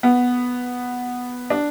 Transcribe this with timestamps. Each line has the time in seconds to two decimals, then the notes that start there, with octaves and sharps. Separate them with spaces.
0.03 B3
1.50 D4